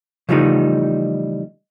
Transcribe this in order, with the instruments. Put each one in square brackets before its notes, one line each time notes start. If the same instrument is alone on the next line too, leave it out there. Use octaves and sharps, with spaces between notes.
[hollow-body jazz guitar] C#3 E3 F3 G3 A3 D#4